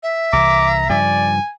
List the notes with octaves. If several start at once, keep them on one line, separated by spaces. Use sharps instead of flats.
E5
C2 E3 A#5 D6
G2 C#3 F3 D5 G#5